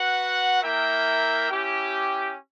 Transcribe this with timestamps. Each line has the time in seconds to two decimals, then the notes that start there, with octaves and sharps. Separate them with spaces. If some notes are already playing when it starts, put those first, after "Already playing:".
Already playing: F#4 B4 F#5
0.63 A#3 E4 A#4 E5 G5
1.49 C#4 E4 G4